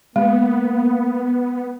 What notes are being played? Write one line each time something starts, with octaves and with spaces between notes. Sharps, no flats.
G#3 A#3 B3